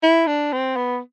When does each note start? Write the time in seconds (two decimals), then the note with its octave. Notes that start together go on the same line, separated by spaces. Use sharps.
0.03 E4
0.27 D4
0.52 C4
0.76 B3